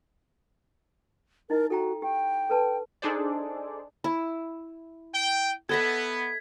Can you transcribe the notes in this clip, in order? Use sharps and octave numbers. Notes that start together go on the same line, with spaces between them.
D#4 E4 A#4 D#5
F#4 A4 G5 A#5
G4 G5
A4 B4 A5
D4 D#4 G#4 A4 C5 D5
E4
G5
B3 A4 D#5 E5 G#6 B6